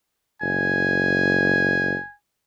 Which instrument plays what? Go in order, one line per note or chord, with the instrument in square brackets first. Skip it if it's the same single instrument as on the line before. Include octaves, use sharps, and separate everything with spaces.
[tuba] F#1 [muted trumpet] G#5